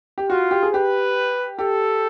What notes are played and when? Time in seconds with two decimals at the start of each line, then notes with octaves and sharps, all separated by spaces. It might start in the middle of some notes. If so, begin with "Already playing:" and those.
0.18 G4
0.29 F4 F#4
0.51 G4
0.63 G#4
0.73 G4 B4
1.59 G4 A4